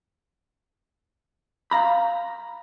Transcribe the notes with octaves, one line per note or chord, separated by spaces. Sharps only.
F5 A#5 B5